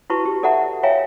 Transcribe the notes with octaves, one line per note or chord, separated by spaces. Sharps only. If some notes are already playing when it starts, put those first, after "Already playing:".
E4 F#4 B4 A5 C#6
G4
A4 D5 E5 F#5 A5 A#5
C#5 E5 F5 G5 G#5 A#5